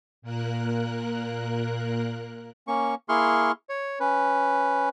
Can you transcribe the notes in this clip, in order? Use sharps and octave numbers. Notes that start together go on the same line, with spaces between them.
A#2 A#3 A#4 F#6
A#3 C#4 C#6
A#3 E4 G#4 C6 C#6 F6
C#5
C#4 B4